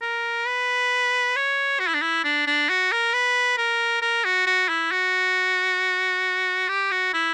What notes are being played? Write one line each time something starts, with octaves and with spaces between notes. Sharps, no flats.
A#4
B4
C#5
F#4
E4
D4
E4
D4
D4
F#4
A#4
B4
A#4
A#4
F#4
F#4
E4
F#4
G4
F#4
E4